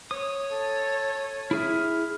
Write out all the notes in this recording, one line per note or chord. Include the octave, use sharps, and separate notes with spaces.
C#5 D#6
A4
E4 G#4 E5 F6